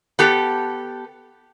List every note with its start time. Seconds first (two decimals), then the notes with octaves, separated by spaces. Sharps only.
0.19 B3 G4 A4